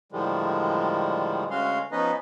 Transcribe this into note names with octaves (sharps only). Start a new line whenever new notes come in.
A2 D3 D#3 F3 G3 G#3
D2 G#3 C#4 F#4 F5 C6
F3 B3 C#4 D#4 B4 D#5